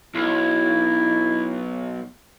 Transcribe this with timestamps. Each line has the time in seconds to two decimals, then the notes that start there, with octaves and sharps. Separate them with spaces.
0.15 B1 E4